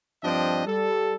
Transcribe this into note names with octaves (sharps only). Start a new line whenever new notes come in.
G2 F3 C4 D4 D#5 G5
G3 A4